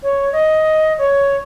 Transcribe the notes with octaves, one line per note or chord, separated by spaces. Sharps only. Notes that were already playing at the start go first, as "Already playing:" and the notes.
C#5
D#5
C#5